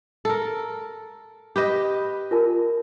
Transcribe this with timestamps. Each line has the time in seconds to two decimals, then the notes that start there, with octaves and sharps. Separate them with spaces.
0.25 A4 A#4
1.56 G4 B4 D#5
2.31 F4 A#4 A5